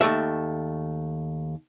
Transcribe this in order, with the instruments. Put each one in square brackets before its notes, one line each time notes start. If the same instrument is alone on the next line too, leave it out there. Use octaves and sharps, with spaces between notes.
[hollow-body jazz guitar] D#2 D#3 A3 E5